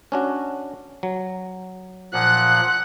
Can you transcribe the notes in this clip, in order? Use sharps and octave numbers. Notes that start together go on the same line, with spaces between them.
C#4 D4 F#4
F#3
A#2 F3 F#5 F#6